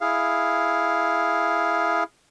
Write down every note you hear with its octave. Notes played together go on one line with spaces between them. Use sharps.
E4 G#4 F5